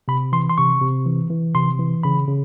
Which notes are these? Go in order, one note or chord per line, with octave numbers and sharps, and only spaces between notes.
C3 B5
E3 C6
C6
C3 C#6
C3
E3
E3
C3 C6
E3
C#3 B5
C#3